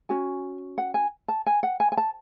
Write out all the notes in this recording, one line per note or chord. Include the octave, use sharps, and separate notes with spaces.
C#4 F#4 G#5
F#5
G#5
A5
G#5
F#5
G#5
G#5
A5